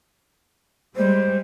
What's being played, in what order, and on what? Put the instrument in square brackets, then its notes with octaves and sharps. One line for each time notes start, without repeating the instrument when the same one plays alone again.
[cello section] G3 G#3 [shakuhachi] C5